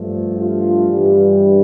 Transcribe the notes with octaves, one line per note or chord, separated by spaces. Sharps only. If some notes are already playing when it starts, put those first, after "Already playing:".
Already playing: G2 F3 A3
F4
G2 E3 G3